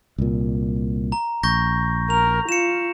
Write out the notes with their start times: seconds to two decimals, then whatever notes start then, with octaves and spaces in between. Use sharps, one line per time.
0.18 C2 A#2
1.12 A#5
1.43 A#1 C#6 G6 A#6
2.10 A#4 F7
2.49 F4 C#7 E7